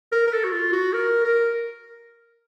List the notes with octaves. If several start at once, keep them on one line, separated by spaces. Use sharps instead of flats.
A#4
A#4
A4
F#4
F4
F#4
A#4
A#4